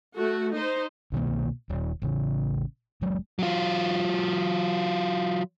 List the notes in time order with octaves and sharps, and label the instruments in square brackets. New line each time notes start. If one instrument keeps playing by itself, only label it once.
[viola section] A3 F#4
D#4 C5
[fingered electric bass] C2 B2 D#3 A#3
D#1
A1 C#3
F#1 F#3 G#3
[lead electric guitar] F#3 F4